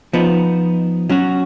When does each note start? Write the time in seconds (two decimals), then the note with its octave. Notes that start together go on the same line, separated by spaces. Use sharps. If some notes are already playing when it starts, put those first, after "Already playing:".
0.13 F3 B3 D#4
1.09 F#3 C#4 F#4